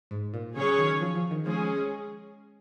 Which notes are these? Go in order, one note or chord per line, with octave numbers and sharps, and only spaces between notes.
G#2
A#2
C#3 F#3 C#4 G#4 C#5
D#3
F3
F3
D#3
F3 G#3 C#4 G#4